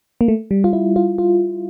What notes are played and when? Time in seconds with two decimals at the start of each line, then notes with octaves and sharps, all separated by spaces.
0.21 A#3
0.28 A3
0.51 G3
0.64 F4
0.73 E4
0.96 F4
1.18 F4